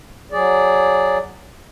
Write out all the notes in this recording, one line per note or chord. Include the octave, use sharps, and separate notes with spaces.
F#3 G#4 D5